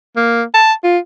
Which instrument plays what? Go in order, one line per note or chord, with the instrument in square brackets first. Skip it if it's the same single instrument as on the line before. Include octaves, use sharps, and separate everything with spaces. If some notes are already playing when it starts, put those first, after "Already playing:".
[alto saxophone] A#3
A5
F4